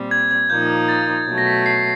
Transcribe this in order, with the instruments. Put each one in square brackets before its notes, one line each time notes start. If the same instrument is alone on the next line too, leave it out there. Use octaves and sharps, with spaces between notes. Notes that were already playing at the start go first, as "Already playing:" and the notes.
Already playing: [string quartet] A#2 G3 C4
[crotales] G#6
G#6
[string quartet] A#2 F3 A#3 D#4 [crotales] G6
[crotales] A6
[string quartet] B2 F#3 A3
[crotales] A#6
B6
C7